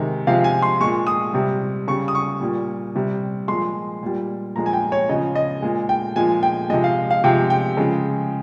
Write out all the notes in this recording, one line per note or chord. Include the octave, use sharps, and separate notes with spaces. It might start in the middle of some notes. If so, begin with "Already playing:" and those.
Already playing: C3 D#3 G#3
C3 F3 G#3 F5
G#5
C6
A#2 G#3 C#6
D#6
C3 G3
C#3 G3 C#6
D#6
C#6
A#2 G3
C3 G3
A#2 F3 G#3 C6
A#2 G3
A#2 F3 G#3 A#5
G#5
G5
C#5
C#3 F3 G#3 D#5
D#5
A#2 G#3
G5
A#2 F3 G#3 G#5
G5
C3 F3 G#3 D#5
F5
F5
C3 F3 G#3 G5
G5
C#3 F3 G#3